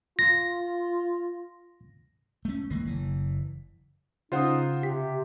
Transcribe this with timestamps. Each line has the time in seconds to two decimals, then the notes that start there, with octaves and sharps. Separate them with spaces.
0.19 F4 A#6
2.45 A3 C#4
2.70 D#3 E3 G#3 A#3
2.85 F#1 E3
4.32 C#3 D#4 F4 C5 F#5
4.83 C3 G4 B6